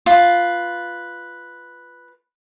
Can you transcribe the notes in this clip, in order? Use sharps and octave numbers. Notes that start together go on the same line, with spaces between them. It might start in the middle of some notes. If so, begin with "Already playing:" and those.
F4 B4